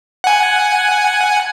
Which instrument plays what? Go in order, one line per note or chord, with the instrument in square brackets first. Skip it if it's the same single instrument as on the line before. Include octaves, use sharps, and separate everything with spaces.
[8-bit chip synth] F#5 G#5